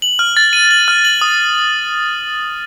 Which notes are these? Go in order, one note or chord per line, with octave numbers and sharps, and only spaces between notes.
F#7
F6
A6
D#7
F#7
F6
F#7
D#6